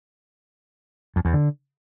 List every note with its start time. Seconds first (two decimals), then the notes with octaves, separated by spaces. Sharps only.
1.16 F2
1.25 E2
1.33 D3